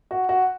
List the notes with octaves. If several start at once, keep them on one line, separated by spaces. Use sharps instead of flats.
F#4
F#4